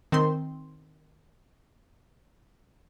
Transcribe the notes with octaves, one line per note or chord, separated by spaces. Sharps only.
D#3 C4 C6